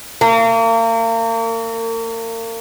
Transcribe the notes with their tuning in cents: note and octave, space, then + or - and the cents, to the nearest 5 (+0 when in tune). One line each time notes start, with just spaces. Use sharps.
A#3 -40